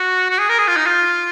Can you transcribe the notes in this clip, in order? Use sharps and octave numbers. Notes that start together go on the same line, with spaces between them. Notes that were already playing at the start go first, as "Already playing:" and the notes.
Already playing: F#4
F#4
G#4
A#4
G#4
F4
D#4
F4